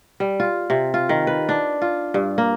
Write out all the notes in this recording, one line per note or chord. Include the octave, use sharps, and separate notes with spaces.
G3
F4
C3
F4
D#3
B4
D4
F4
G2
A#3